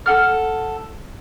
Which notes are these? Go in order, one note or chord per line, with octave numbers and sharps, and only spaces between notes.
A4 F#5 F6